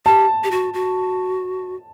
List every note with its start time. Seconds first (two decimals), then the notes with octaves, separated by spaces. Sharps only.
0.06 G4 A5
0.44 G4
0.51 F#4
0.74 F#4